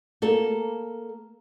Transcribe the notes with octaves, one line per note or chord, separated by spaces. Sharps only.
A#3 A4